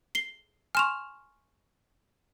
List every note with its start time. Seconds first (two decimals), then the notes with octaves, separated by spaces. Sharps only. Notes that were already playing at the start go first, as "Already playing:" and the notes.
0.15 C7 G7
0.75 G#5 C6 C#6 F6 E7 F7